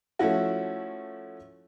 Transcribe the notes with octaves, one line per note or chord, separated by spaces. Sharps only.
F3 A3 C#4 E4 F#4